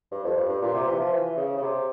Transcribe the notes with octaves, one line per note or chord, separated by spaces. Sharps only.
G2
F2
G2
G2
A#2
C3
E3
F3
E3
C#3
C#3
C3